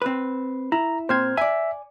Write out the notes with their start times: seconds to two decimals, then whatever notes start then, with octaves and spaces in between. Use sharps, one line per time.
0.02 C4 B4
0.72 E4 A#5
1.09 A#2 C4 C5 F6 G#6
1.37 D5 E5 G#5